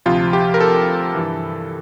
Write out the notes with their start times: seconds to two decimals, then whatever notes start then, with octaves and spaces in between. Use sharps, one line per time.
0.06 D2 C3 F3 F4
0.33 G4
0.54 A#4
0.60 A4
1.15 G2 E3